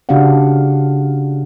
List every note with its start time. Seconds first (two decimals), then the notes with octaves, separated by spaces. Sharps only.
0.09 C#3 D4 F#4 G4 F5 F#5